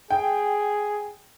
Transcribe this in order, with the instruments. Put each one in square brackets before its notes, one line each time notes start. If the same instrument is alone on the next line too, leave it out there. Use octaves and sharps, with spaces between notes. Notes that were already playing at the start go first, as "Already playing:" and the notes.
[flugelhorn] G#4 [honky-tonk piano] G5